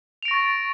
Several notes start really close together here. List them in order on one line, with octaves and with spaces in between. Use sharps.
F7 D7 A#6 C#6 A6